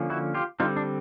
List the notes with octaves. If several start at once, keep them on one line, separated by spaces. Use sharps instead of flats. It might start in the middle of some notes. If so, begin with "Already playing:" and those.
Already playing: D3 F3 A#3 C#4
E4 F#4
F4 G4
D3 G3 C4 D#4 F4
D4